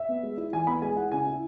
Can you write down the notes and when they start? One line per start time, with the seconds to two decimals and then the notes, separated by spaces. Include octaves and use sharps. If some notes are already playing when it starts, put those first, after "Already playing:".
Already playing: E5
0.09 B3
0.23 G#3
0.38 E4
0.53 E3 G#5
0.67 B3 B5
0.82 G#3 G#5
0.97 E4 F#5
1.11 C#3 G#5
1.27 E4